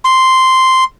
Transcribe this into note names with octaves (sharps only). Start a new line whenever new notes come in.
C6